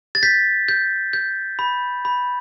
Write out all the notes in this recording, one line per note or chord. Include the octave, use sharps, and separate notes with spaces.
A6
G6 B6
G6
G6
B5
B5